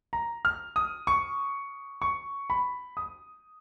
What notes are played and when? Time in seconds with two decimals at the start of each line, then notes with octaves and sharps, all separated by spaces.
0.13 A#5
0.45 F6
0.76 D#6
1.07 C#6
2.02 C#6
2.50 B5
2.97 D#6